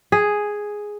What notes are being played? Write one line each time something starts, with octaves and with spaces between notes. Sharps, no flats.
G#4